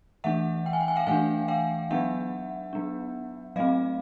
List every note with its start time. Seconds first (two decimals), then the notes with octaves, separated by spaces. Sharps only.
0.24 E3 A3 D4 E5 F#5
0.66 G5
0.73 G#5
0.81 G5
0.88 G#5
0.96 F5 G5
1.07 E3 A3 D4 F#5 G#5
1.48 F5 G5
1.91 F#3 B3 D4 E5 F#5
2.73 F#3 B3 D4
3.56 F#3 A3 C4 D#5 F5